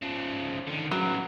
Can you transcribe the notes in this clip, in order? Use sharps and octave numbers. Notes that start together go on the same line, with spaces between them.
C#3 F3
D3 D#3
C#3 E3 F#3